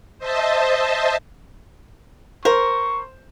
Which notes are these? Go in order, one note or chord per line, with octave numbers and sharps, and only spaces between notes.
C5 D#5 E5 A5
A#4 C5 C#6